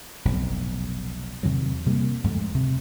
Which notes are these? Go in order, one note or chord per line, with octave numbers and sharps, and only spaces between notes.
F1 B1 A2 C3
E2 C3 D#3 F#3
C3 G3 A#3
F2 G#2 D3 A3
D2 C3